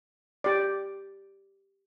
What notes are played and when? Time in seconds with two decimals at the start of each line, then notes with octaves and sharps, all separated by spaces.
0.44 G4 D5